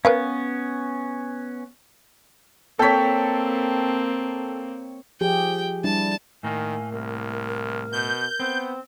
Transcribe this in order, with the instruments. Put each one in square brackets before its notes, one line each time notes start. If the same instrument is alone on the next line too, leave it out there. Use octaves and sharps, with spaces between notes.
[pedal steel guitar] B3 C#4 [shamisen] A#4 B4 F5
[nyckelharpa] A#3 C4 [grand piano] A4 B6 [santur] C#5 G5
[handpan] F3 G4 G#4 [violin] G5
[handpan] G3 D4 E4 [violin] A5
[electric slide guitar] A2 A#3 [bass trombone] D#3 [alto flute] G#5
[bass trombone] C2 [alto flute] A#4
[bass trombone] B2 [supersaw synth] G6
[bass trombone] B3 [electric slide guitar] C4